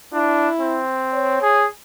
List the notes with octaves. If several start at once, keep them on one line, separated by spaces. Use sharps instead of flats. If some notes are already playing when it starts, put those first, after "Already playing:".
D4 E4
C4
C#5
G#4